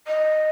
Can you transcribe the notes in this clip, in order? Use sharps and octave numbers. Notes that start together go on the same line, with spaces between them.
D#5